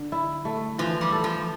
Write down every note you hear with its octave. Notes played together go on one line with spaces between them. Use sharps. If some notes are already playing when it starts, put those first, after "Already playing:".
Already playing: D3
E4
A3
E3 F3
G3
A4
F3